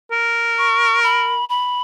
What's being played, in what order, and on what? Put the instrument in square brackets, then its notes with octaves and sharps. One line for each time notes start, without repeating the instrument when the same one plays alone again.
[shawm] A#4
[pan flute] C#6
B5
B5